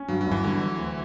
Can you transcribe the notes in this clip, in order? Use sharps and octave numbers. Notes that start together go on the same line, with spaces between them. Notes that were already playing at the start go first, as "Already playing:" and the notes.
Already playing: C#4
G2 F#3
F#3
G1 E3
D3 G3
E3
D2